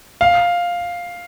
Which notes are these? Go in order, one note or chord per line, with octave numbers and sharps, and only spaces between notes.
F5